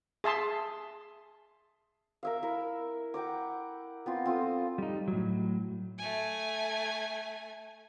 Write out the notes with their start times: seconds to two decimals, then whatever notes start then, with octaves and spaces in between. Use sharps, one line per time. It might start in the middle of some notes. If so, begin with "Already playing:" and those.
0.24 G#4 E5 A5 C6
2.23 A#4 E5 F5
2.43 E4 A#4
3.14 F#5 G5 A#5 D6
4.06 B3 C4 F4
4.26 C4 F4 A4 D#6
4.78 G3 D#4
5.08 A2 F#3
5.98 A3 G#5